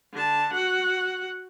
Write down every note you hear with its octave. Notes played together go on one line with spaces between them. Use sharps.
D3 A5
F#4 F#5